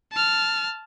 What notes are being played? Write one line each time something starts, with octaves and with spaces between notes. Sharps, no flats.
A5 F6